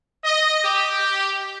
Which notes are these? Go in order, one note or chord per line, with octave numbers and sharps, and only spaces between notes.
D#5
G4